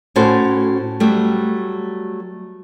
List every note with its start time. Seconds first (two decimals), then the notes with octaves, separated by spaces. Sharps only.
0.16 A2 C#4 F#4 A4 C5
1.00 F#3 G3 A3